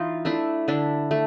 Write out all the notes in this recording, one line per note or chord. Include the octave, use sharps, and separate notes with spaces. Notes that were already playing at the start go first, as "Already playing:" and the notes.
Already playing: E3 D#4 F4
A3 D4 E4
D3 D4 E4
A3